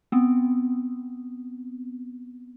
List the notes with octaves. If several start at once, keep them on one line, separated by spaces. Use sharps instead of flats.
B3 C4